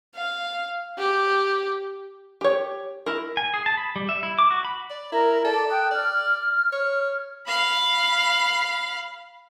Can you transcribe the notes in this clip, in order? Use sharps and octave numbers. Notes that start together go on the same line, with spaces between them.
F5
G4
G4 C#5
E4 A#4
G#5
G#4
A5
B5
G3
E5
E4
D6
F#4
B5
D5
E4 A#4 A#5
A4 D5
G5 D#6 F#6
D5 F6
C#5
F5 B5